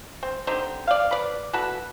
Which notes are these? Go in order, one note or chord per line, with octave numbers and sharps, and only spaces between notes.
C4
D3 C4 D#4 G4
D5 F5
B4 D5
E4 F#4 A4 B4